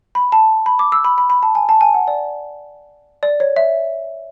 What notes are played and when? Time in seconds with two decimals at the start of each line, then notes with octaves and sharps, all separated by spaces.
0.15 B5
0.32 A5
0.66 B5
0.79 D6
0.92 E6
1.05 B5
1.18 B5
1.30 B5
1.43 A5
1.55 G#5
1.69 A5
1.81 G#5
1.94 F#5
2.08 D5
3.23 D5
3.40 C#5
3.56 E5